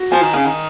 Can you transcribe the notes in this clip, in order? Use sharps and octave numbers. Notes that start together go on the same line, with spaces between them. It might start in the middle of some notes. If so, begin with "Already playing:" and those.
Already playing: F#4
F3 G#5
D#3
C#3 G#5
D#3